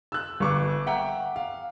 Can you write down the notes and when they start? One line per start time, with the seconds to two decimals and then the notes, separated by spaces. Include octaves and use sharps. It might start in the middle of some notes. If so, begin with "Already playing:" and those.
0.12 E6 F#6
0.40 G1 C#6 D6
0.86 E5 F#5 G5 A#5
1.36 F5